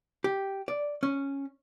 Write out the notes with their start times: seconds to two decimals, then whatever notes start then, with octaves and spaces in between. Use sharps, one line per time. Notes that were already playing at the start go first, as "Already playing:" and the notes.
0.24 G4
0.68 D5
1.03 C#4